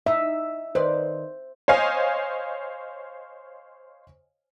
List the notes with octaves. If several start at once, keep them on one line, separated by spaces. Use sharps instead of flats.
D#4 E5
D#3 B4 C5 D5
C5 C#5 D#5 F5 G#5